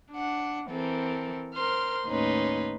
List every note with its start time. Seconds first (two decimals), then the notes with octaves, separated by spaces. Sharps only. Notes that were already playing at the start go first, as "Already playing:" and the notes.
0.12 D4 F#5
0.68 E3 C4 A4 A#4
1.55 A#4 C5 C6 F6
2.07 D#2 A2 C#4 D#4 B4 C6